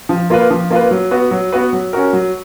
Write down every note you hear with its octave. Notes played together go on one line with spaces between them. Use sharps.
F3
A#3 F4 B4
F3
A#3 F4 B4
F#3
B3 F#4 B4
F#3
B3 F#4 B4
F#3
C#4 F#4 A#4
F#3